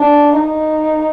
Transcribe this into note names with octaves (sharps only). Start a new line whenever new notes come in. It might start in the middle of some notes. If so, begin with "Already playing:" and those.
Already playing: D4
D#4